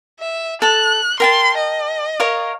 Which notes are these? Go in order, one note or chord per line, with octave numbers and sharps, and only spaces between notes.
E5
A4 A5 F#6
A#4 G5 A5 C6
D#5
A#4 C#5 F5